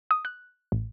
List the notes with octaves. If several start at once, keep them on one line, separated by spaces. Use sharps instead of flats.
D#6
F#6
A1